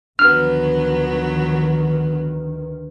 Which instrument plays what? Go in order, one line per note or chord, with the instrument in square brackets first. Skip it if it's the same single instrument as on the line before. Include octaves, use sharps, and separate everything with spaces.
[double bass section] D2 D#3 [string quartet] F3 F#3 B3 [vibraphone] D4 B4 [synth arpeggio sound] F6